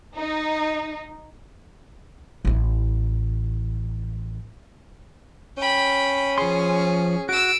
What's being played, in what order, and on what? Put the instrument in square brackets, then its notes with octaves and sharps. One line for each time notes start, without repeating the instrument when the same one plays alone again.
[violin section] D#4
[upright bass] A1 E4
[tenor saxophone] C#4 [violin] G5 B5
[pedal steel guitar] F3 C6 [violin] G#4
[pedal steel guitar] F#4 [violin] E6 D7